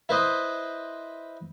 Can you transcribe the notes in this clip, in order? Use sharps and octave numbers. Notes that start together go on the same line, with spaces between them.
E4 B4 C5 D#5